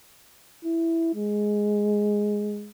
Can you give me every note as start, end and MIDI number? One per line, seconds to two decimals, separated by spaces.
0.65 1.11 64
1.15 2.70 56